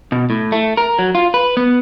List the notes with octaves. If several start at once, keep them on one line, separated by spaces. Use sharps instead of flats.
B2
A2
A3
A#4
F#3
F4
B4
B3